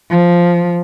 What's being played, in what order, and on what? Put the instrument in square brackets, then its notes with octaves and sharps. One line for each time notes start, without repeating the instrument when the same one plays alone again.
[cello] F3